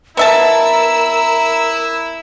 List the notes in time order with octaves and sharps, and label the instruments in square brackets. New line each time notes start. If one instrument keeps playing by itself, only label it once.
[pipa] B3 E5 A5 [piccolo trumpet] E4 [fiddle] A#4 E6 [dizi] A#5